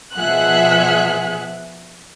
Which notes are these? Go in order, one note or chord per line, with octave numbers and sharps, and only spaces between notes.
B2 F3 G#4 E5 F#5 F#6